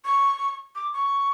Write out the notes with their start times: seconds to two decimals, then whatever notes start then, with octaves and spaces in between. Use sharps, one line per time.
0.05 C#6
0.75 D6
0.93 C#6